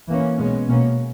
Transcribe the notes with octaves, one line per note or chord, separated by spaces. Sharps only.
E3 A#3 C#4
B2 G#3 C#4
B2 A#3 C#4